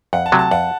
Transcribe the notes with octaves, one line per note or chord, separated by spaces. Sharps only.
F2 F#5
A5
C3 F#3 A3
A5
F2 F#5